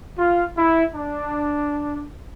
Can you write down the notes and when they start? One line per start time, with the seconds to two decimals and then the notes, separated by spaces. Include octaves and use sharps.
0.18 F4
0.57 E4
0.95 D4